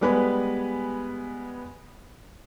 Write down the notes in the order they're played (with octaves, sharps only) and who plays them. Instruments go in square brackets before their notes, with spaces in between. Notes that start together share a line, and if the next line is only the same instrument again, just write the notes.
[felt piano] G3 G#3 B3 B4 G#5 B5